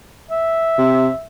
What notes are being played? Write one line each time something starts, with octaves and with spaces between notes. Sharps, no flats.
E5
C3